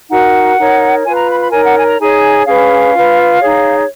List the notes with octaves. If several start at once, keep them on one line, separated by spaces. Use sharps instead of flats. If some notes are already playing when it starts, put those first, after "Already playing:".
D#4 F#4 A#4 F#5
D#4 A#4 C#5
F4 B4 G#5
A#5
B5
B5
D#4 A#4 C#5 G#5
F#5
G#5
A#5
D#4 G#4 C#5 G#5
C#4 G#4 B4 F5
F4 B4
D#4 G#4 C#5